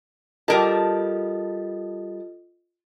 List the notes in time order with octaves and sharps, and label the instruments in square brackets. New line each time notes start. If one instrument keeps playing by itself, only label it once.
[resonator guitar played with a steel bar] G3 A#4 A5 [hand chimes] F4 A4 D#5